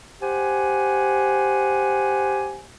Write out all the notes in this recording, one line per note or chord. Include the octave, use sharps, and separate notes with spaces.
G4 C5 F#5 G#5